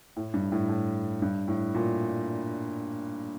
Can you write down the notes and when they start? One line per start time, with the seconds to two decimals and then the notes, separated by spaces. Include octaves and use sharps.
0.16 A2
0.34 G2
0.52 A2
0.69 A2
1.22 G2
1.48 A2
1.75 A#2